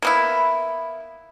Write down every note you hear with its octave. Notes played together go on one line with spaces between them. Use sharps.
A#3 B3 E4